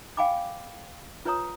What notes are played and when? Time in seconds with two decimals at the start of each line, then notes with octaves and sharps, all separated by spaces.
0.17 F5 G5 G#5 B5 D6
1.25 F4 B4 C#5 A#5 D#6